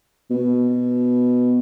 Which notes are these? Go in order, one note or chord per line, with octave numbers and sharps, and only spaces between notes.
B2